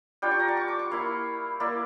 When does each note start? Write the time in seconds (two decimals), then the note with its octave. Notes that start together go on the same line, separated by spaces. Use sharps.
0.22 G3 D4 F4 G5
0.31 C#6
0.39 A#5
0.48 A5
0.57 C#6
0.68 D6
0.79 C#6
0.91 A#3 E4 F5
1.60 A#3 E4 D5